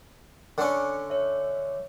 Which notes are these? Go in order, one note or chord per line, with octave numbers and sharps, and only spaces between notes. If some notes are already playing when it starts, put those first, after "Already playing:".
D3 C#4
C#5 E5